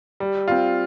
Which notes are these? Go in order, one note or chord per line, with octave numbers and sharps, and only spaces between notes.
G3
C4 F4